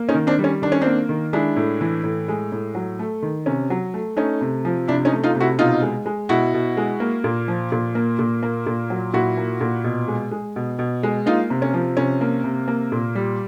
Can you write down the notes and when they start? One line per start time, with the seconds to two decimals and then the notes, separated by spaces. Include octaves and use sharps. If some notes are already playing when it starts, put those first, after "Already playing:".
Already playing: A#3
0.09 C#4 D#4
0.15 D#3
0.27 C4 D4
0.39 G3
0.44 C#4
0.62 D#3 D4
0.72 C#4
0.81 A#3 C4 D4
1.09 D#3
1.33 G#3 D4 E4
1.56 A2
1.81 E3
2.04 A2
2.28 G#3
2.52 A2
2.75 F#3
2.99 A3
3.22 D#3
3.46 C3 C#4
3.70 F#3
3.94 A3
4.16 A3 C#4 D#4
4.41 C3
4.65 F3
4.88 C3 D4 E4
5.05 C#4 D#4
5.12 A3
5.24 D#4 F4
5.35 C3
5.40 E4 F#4
5.59 B2 D#4 F4
5.82 G#3
6.06 G#3
6.29 B2 E4 F#4
6.54 B2
6.77 G#3
7.00 A#3
7.24 A#2
7.48 F3
7.72 A#2
7.95 A#3
8.19 A#2
8.43 A#3
8.67 A#2
8.90 F#3
9.14 A#2 E4 F#4
9.37 A#3
9.61 A#2
9.84 B2
10.08 G#3
10.31 G#3
10.56 B2
10.79 B2
11.03 G#3
11.26 A#3 D#4 F4
11.50 C3
11.62 C#4
11.74 F3
11.97 C3 C#4
12.21 A#3
12.44 C3
12.68 A#3
12.92 A#2
13.15 G3